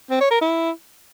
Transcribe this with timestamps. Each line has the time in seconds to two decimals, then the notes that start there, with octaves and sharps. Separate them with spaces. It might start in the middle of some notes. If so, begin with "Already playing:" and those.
0.10 C4
0.21 C#5
0.31 A#4
0.41 E4